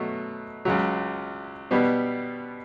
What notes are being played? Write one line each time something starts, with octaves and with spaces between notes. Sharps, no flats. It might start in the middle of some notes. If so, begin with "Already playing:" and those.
Already playing: B2 F#3 A3
C#2 C#3 F#3
B2 G3 B3